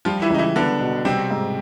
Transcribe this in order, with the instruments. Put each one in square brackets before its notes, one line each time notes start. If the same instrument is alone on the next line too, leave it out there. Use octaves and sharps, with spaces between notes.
[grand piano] F3 F4 [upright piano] G3
[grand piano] E3 E4
[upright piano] C#2 [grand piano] D#4
[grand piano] E3 E4
[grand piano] D3 D4 [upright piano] B3
[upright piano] B2
[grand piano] C3 C4 [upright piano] G3
[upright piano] G#2